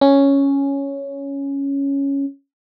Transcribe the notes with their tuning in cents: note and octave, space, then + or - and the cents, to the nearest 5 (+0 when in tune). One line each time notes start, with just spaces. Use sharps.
C#4 +0